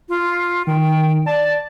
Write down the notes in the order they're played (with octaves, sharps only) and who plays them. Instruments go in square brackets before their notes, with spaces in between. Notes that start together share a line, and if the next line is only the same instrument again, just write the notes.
[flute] F4
[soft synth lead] D#3 [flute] G5
[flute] D5 [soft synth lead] A5